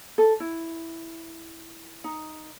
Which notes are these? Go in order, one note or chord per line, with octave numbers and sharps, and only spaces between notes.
A4
E4
D#4